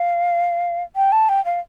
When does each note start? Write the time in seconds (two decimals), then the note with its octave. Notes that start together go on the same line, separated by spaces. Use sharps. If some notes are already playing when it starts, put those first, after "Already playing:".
Already playing: F5
0.96 G5
1.12 A5
1.29 G5
1.45 F5